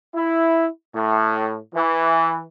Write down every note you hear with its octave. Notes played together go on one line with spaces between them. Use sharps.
E4
A2
E3